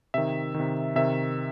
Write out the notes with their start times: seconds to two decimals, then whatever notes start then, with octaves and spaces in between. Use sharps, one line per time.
0.14 C3 D#3 E5
0.54 D#3
0.60 C3
0.96 C3 D#3 E5